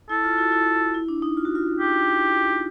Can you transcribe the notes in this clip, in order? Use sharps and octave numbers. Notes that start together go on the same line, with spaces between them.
E4 A4
F4
E4 F#4
E4
E4
D4
D#4
F4
F#4
F4
G4